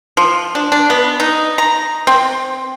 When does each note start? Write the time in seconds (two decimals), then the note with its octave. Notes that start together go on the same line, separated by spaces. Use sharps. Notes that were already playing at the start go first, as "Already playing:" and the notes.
0.17 F3
0.55 D4
0.72 D4
0.90 B3
1.20 D#4
1.58 A#5
2.07 C4